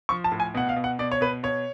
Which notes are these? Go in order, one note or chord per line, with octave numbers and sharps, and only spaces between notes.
F3 C#6
A5
A2
G#5
B2 F#5
F5
B2
F#5
B2 D5
C#5
B2 B4
B2 C#5